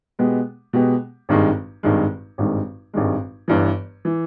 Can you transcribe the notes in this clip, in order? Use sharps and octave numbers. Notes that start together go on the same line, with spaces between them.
B2 G#3 B3 G4
B2 G#3 B3 G4
G#1 G2 D#3 G#3
G#1 G2 D#3 G#3
G#1 G2 D#3 G#3
G#1 G2 D#3 G#3
G1 G2 E3
E3